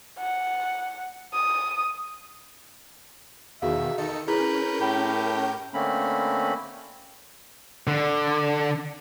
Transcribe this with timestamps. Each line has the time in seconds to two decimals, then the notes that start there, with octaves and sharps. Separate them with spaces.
0.18 F#5
1.33 D#6
3.62 E2 B2 D#3 F#4 G#4 E5 F5
3.98 D#3 D#4 A4 C#7
4.28 C#4 E4 G#4 A#4 B4 A#5 G6
4.80 A2 G4
5.74 D3 A3 A#3 C4 C#4 B5
7.87 D3